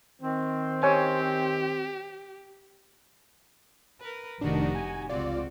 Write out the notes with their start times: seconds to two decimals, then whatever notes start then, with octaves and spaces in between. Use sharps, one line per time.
0.22 D#3 C4
0.83 G4 C#5 G#5
4.00 A#4 B4
4.41 F1 D#3 D4 D#4 F#4 G4
4.75 G#5
5.09 C#2 C4 F4 F#4 D5